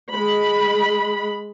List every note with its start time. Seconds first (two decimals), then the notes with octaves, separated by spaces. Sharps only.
0.13 G#3 B5